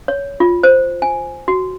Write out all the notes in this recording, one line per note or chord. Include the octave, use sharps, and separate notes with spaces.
C#5
F4
C5
G#5
F#4